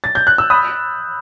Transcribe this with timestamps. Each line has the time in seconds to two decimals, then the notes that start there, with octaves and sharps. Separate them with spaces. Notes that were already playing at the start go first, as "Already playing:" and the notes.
0.04 A6
0.15 G6
0.27 F#6
0.38 E6
0.50 B5 D#6